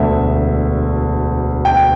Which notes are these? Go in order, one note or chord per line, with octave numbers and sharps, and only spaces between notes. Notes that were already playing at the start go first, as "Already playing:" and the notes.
Already playing: E1 D2 D3 E5
G5